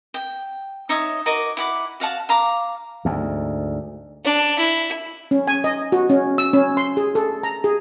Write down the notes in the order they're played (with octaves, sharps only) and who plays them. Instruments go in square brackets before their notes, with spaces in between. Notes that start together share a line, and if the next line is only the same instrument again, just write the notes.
[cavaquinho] G5
D#4 C#5 E5 D#6
F#4 A#4 D#5 D6
E4 F#5 D6
F#4 F5 F#5 A5
F5 A#5 D6
[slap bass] D2 G#2
[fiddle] D4
E4
[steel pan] C#4
G#5
D#5
F#4
C#4
E6
C#4
C6
G#4
A4
A#5
G#4